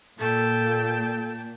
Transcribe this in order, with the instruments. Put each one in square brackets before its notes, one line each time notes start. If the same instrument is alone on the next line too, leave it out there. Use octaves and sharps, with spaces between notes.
[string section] A#2 [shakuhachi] A4 [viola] G5 A5